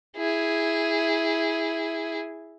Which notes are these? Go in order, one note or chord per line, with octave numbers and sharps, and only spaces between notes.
E4 G#4